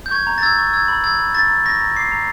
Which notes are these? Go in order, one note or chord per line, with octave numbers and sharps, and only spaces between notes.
G6
C#6 G#6
A#5
A6
E6 G#6
C#6
E6 G#6
B5
E6 G#6
B5
C#6 A6
A#5
C#6 A#6
A#5
D6 C7
A#5